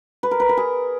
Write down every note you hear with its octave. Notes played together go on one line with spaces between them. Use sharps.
B4
A#4
B4
A#4
G#4